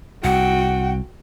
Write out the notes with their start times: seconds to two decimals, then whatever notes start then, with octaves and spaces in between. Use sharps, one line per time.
0.24 C2 F#4 F#5 G5